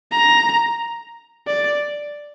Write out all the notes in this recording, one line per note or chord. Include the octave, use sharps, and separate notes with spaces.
A#5
D5